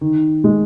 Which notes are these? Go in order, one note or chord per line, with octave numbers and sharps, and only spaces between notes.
D#3
G#3